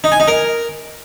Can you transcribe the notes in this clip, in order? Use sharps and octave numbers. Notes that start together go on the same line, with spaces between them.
D#4
G#5
D#4
A#4